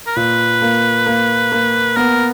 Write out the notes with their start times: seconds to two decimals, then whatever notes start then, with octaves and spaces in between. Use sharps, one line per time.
0.07 A#4
0.16 A#2 B4
0.62 A#3
1.07 A#3
1.52 A#3
1.97 B3 A#4